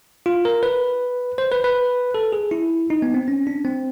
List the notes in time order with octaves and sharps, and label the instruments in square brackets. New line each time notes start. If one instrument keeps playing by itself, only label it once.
[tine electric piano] F4
A#4
B4
C5
B4
B4
A4
G#4
E4
D#4
B3
C4
C#4
D4
C4